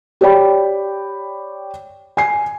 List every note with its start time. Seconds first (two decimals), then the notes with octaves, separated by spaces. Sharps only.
0.21 G4 C#5 D5 G5 B5
2.17 G#5 C7